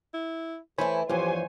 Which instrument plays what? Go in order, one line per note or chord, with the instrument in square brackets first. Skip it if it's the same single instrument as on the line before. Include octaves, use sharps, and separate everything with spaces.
[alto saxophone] E4
[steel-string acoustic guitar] E3 A3 E4 [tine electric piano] C5 G#5 B5 [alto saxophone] C#5
[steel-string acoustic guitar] E2 G2 [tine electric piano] E3 F3 [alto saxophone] G4 [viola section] C5 C#5 G#5